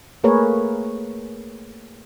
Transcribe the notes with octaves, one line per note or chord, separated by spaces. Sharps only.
A3 A#3 G#4 A#4 B4 C#5